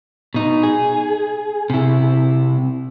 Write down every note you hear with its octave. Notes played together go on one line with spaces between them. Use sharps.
B2 D#4
G#4
C3 E4